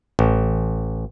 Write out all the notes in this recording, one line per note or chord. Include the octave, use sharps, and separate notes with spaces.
A1